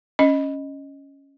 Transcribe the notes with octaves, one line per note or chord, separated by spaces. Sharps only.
C#4 D#5